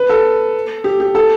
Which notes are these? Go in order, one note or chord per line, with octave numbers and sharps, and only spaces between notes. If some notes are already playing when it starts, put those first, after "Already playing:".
Already playing: B4
A4
G4
G4
A4